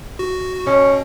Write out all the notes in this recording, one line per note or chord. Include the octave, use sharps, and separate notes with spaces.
F#4
B2 C#4